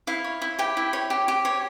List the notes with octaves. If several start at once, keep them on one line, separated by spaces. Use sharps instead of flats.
E4 F5
C#5
E4
G4 G5
E4
C#5
G4
G4
C#5